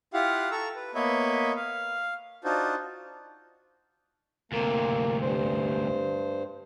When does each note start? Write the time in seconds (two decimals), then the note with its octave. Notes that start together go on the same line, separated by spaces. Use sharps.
0.14 E4 F4 G4 F5 F#5
0.52 A4 A#5 C#6 E6
0.75 B4
0.95 A#3 B3 C#5 D#5 E5 B5
1.57 F5
2.44 D4 D#4 F4 F#4 C5
4.52 D2 C3 A#3
5.22 G2 C5